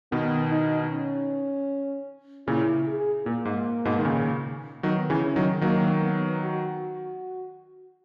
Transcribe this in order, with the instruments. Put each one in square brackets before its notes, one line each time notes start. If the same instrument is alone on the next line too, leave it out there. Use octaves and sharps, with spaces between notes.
[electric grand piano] B2 D#3 [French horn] B3
[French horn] D#4
C#4
[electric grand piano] A#2 C#3 [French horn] E4
[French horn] G#4
[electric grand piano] A#2 [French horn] A#3
[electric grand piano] G#2
G#2 B2
D#3
A#2 C#3
[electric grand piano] D#3 F#3 [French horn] B3
[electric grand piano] C#3 E3
[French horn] C#4
[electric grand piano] D#3 F#3
[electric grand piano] D#3 F#3 [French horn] A#3
[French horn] B3
F#4